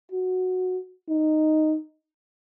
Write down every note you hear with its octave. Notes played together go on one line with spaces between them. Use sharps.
F#4
D#4